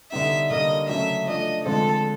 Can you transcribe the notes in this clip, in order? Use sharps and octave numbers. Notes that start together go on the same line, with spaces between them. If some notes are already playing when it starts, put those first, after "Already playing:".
D3 G3 B3 D#4 E5
D3 G3 A#3 D4 D#5
C#3 F#3 A3 E5
F3 A3 D4 D#5
D3 F3 G#3 C4 A4